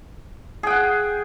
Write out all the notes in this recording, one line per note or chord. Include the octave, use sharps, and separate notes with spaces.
G#4 F#5 G5